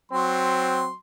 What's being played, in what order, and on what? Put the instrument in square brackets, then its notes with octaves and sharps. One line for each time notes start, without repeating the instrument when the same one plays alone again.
[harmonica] F#3 C6 [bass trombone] C4